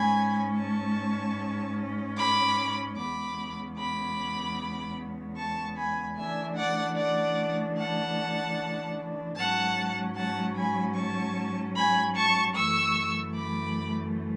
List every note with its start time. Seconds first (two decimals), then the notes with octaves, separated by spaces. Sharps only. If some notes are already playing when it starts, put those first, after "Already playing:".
Already playing: G#2 G#3 C#4 G#5 B5
0.58 A5 C#6
2.18 B5 D6
2.98 E2 C#3 G#3 B3 B5 D6
3.77 B5 D6
5.36 A5 C#6
5.77 G#5 B5
6.17 C#3 E3 A3 D4 E5 G#5
6.57 D5 F#5
6.96 D5 F#5
7.77 F#5 A5
9.36 G#2 F#3 C#4 F#5 A5
10.16 F#5 A5
10.56 G#5 B5
10.95 A5 C#6
11.75 G#5 B5
12.15 A5 C#6
12.55 F#2 E3 A3 C#6 E6
13.34 B5 D6